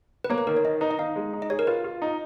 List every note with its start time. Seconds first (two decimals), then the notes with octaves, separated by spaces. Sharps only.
0.24 B4
0.30 A#3 C#5
0.38 B4
0.47 D#3 A#4
0.57 C#5
0.65 D#3 D#5
0.81 D#4 B4
0.91 D#5
0.99 D#4 F5
1.16 G#3
1.33 D#4
1.42 D#5
1.50 G#4 C#5
1.59 A#4
1.67 F4 B4
1.84 F4
2.02 D#4